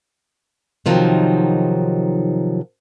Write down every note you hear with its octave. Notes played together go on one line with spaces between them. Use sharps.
C3 D#3 F3 F#3 D#4